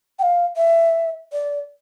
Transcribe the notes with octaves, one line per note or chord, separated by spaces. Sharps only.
G5
F5
E5
D5